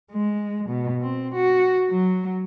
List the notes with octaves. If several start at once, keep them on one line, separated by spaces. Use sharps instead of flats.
G#3
B2
C4
F#4
F#3